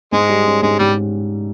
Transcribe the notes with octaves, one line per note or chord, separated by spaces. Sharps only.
G#2 G#3
G3
C#4
G#2 G#3
G#2 G3